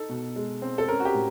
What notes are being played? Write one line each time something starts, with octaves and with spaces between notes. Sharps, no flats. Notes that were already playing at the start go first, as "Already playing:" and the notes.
Already playing: D#4 A4
B2
G#3
C4
A4
C#4 A#4
F#4
G4
A2